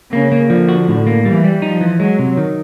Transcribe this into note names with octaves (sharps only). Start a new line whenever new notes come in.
C#3 A#3
A#3
D3 F3
F#4
A2
A#3
E3 G3
G3
F3 D#4
E3
F#3 G#3
C3
D#3